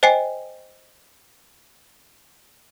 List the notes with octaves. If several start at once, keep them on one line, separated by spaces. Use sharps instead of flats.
C5 D#5 G5 G#5 C7